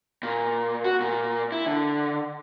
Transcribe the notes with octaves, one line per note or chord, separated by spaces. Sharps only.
A#2
F#4
A#2
E4
D3